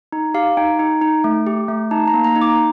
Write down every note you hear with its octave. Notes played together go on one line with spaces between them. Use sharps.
D#4
G4 F5
D#4 G5
D#4
D#4
A3
G4
A3
D#4 A5
A#5
A#3
A#5
D#4
D6